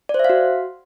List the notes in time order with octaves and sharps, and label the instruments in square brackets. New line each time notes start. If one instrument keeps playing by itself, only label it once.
[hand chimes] D5
C5
E5
F5
F#4